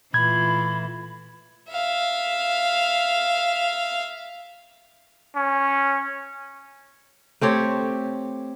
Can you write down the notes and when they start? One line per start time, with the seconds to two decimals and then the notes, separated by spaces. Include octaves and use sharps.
0.14 A#2 E3 A3 F4 B5 G#6
1.71 E5 F5
5.36 C#4
7.41 A3 C4 G4 C#5